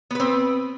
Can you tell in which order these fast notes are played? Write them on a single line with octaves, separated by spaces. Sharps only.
B3 B4 C4